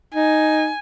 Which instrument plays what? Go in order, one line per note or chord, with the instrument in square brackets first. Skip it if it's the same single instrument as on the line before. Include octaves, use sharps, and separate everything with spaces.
[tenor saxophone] D#4 [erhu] G#5